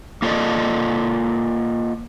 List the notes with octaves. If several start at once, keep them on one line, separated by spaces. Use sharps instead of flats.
A#3 F4 A4 C5 D5 D#5